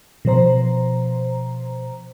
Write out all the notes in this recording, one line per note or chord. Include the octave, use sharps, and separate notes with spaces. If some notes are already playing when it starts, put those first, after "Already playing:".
B2 F3 C5 A#5